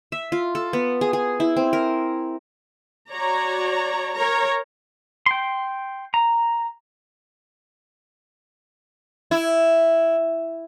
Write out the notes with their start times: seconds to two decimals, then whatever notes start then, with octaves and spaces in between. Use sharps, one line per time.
0.12 E5
0.32 F4
0.55 A4
0.73 B3
1.01 G#4
1.13 G#4
1.40 E4
1.56 C4
1.73 A#4
3.11 F#4 C#5 D5 A#5
4.15 A#4 C#5 A#5
5.26 G5 C6
6.14 A#5
9.31 E4